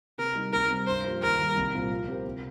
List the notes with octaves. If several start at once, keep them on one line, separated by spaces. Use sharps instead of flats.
C3 A#4
G3 D#4 A#4
C3 A#4
G3 C4
G2 C5
F3 A#3 G4
D#2 A#4
D#3 G3
C2
A#2 G3 C4 F4
F3
C4 G4 A#4
C3